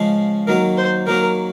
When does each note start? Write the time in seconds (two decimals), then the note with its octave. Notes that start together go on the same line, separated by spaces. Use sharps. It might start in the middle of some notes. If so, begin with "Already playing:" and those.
Already playing: C#3 F3 G#3
0.47 D#3 F#3 A#3 A#4
0.77 C5
1.07 D#3 F#3 A#3 A#4